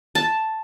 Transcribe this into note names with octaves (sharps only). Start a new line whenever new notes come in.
A5